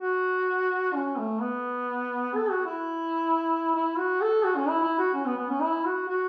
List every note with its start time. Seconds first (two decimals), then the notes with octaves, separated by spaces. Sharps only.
0.02 F#4
0.95 C#4
1.18 A3
1.41 B3
2.35 A4
2.51 F#4
2.66 E4
3.75 E4
3.98 F#4
4.21 A4
4.45 F#4
4.56 C#4
4.68 E4
4.83 E4
4.99 F#4
5.14 C#4
5.26 B3
5.38 B3
5.49 C#4
5.61 E4
5.85 F#4
6.08 F#4